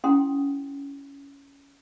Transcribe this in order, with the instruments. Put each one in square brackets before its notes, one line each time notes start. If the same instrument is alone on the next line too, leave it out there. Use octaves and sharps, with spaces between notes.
[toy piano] C#4 E4 F#5 G5 C6 D#6